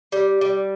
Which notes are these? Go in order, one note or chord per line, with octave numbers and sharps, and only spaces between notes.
G3
G3